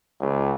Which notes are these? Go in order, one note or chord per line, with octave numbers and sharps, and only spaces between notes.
C#2